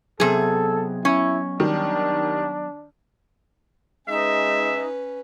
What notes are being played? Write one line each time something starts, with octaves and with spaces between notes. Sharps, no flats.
C3 F#3 B3 G#4 A4
C#4 E4
D#3 G3 D4
G#3 C#4 D#4 B4 E5